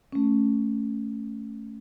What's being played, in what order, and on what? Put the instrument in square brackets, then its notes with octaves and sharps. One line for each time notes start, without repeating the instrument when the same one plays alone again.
[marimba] A3 C#4